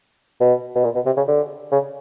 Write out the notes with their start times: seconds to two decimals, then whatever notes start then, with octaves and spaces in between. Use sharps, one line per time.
0.40 B2
0.76 B2
0.84 A#2
0.95 B2
1.06 C3
1.17 C#3
1.28 D3
1.72 C#3